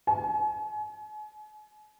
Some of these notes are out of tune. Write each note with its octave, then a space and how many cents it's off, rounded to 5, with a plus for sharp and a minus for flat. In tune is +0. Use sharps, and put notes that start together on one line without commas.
G#5 +35